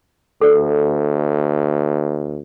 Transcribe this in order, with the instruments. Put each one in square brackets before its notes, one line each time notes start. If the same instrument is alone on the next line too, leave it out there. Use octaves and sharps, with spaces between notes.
[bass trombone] D2 [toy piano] A4 D5